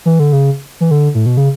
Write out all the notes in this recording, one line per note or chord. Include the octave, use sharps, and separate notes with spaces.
E3
D3
C#3
E3
D3
A2
B2
C#3